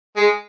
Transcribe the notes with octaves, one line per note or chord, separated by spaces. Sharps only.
G#3